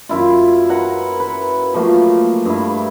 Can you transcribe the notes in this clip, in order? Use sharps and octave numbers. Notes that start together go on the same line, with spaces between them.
F#2 E4 F4
A#4 B4 F#5
B4
F3 F#3 A3 A#3
G2 E4